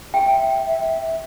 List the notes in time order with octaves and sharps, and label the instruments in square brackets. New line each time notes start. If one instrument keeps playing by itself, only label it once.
[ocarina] E5 [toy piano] G5